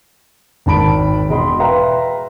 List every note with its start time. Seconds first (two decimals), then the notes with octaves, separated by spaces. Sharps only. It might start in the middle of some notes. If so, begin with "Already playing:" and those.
0.66 G#1 D#3 A5 B5 D7
1.29 E1 D#5 B5 C6
1.60 B4 E5 F5 G5 A#5 C6